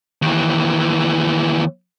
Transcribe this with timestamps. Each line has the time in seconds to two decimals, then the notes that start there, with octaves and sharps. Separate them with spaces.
0.22 D#2 E3